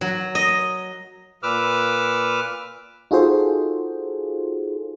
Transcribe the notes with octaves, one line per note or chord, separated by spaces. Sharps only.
F#3
D#5
A#2 B4 D6 E6 F6
D#4 F4 F#4 G#4 A4 C5